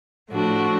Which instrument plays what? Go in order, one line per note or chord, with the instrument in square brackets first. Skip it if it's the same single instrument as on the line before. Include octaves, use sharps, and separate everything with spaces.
[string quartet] A2 F3 A3 D4 F#4